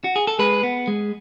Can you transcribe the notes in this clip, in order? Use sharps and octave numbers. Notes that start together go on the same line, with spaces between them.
F#4
G#4
A4
G#3 G#4 B4
B3
G#3